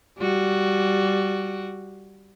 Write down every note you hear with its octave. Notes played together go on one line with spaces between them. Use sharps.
G3 F#4